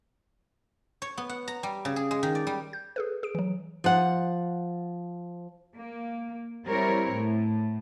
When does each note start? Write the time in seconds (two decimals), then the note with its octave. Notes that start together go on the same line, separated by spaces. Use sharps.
1.02 C#5
1.18 B3
1.29 F#5
1.48 A#5
1.63 G3
1.85 C#3
1.96 G#4
2.11 G#3
2.23 D#3
2.35 D5
2.47 G3
2.73 G6
2.96 G#4 A4 B4
3.23 G#4 D7
3.35 E3 F#3
3.84 F3 F#5
5.74 A#3
6.66 G3 C4 E4 A#4 C#5
7.13 A2